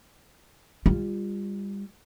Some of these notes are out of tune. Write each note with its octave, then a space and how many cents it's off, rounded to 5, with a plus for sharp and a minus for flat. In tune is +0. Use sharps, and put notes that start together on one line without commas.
G3 +30 F4 +0